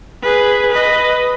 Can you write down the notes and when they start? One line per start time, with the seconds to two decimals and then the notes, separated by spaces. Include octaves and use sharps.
0.22 G#4 B4
0.71 B4 D#5